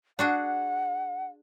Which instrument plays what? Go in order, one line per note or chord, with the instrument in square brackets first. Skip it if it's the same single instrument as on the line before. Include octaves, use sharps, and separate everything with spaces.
[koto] D4 F#4 G#4 [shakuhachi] F#5